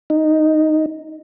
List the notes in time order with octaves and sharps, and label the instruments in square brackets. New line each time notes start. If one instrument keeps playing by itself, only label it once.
[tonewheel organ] D#4